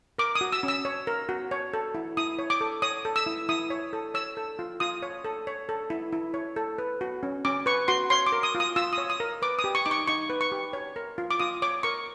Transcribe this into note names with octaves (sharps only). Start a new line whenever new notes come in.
A#4 D6
D#6
F#4
E6
C#4
E6
C#5
A#4
F#4
C#5
A4
E4
E4 D#6
C#5
D6
A4
C#5 D#6
A4
E6
E4
E4 D#6
C#5
A4
C#5 E6
A4
F4
F4 D#6
C#5
A4
C#5
A4
E4
E4
C#5
A4
B4
F#4
C#4
C#4 D6
B4 C#6
F#4 C6
C#5 C6
D6
A#4
D#6
F4
D#6
F4 E6
D#6
C#5
D#6
A#4
B4 D6
D#6
G4
C#6
D#4 D6
C#6
D#4 C#6
B4
C#6
G4
C#5
A#4
F4
D6
F4 D#6
C#5 D6
A#4 C#6